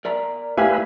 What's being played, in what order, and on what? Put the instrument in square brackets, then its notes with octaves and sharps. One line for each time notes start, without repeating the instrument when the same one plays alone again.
[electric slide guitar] A#4 D5 A#5
[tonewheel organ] A3 E4 B4 [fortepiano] G4 F5 G#5